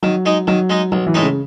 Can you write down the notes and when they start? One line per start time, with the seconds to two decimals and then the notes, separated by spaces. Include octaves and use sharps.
0.02 D#3 F#3
0.26 G#3 D#4
0.47 D#3 F#3
0.70 G#3 D#4
0.92 B1 F#3
1.07 E3
1.14 A2 G#3 D#4
1.22 C#3